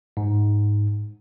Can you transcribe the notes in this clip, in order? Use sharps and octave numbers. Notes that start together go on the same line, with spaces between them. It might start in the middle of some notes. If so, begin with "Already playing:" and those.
G#2